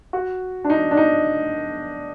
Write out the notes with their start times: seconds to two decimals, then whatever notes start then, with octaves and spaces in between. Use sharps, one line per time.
0.13 F#4
0.64 D4
0.70 D#4
0.91 D4
0.97 D#4